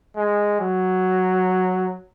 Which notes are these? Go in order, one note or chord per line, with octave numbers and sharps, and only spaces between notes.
G#3
F#3